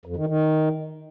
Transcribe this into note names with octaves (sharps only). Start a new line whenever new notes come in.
F2
D#3
D#3